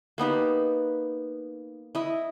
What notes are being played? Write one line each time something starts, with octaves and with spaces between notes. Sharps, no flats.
A#3 B3 D#4 G4
E4 D#5